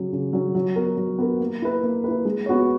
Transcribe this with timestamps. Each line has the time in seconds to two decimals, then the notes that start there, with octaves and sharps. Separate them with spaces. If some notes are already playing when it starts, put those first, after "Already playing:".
Already playing: C#3 F#3 C#4
0.13 C#3
0.33 F#3 C#4
0.55 F#3
0.76 B3 F#4 A#4
0.97 F#3
1.19 B3 F#4 A#4
1.40 A#3
1.62 E4 B4
1.83 A#3
2.04 E4 B4
2.25 G#3
2.46 B3 F#4 C#5